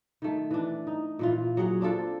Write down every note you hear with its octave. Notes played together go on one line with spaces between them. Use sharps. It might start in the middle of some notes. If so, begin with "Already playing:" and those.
D#3 A3
E3 D4
D#4
A#2 E3 F4
F#3 G#4 C#5 F#5
C4 D4 F4 A4